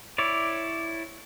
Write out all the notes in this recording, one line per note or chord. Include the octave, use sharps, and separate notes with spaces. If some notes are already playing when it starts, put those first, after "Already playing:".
E4 C#5 D5